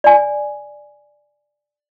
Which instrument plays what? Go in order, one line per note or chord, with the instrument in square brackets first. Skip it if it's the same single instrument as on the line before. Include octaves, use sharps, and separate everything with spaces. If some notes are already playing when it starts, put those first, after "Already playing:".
[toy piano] D5 G#5